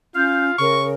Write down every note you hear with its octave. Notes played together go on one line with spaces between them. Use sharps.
C#4 F4 F5 G6
C#3 A#4 C#6